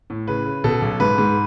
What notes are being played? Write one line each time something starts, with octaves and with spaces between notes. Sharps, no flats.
A2
C#3 B4
C#3
B2 A4
B1
G#2 B4
G#2